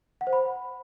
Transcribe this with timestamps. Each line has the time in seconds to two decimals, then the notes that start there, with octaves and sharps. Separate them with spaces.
0.21 F#5
0.27 C5
0.33 B5